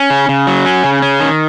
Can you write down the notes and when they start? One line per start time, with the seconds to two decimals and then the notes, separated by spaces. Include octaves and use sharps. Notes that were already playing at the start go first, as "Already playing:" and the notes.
Already playing: C#4
0.10 C#3
0.29 C#3
0.47 F#3
0.66 C#4
0.84 C#3
1.02 C#4
1.21 D#3